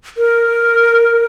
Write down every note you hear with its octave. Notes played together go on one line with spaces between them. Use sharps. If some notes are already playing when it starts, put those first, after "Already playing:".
A#4